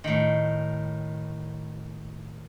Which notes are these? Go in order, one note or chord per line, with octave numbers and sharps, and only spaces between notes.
A2 D#3